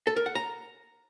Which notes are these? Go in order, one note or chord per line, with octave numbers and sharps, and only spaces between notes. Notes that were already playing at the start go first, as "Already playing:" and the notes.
A4
A#4
F#5
A#5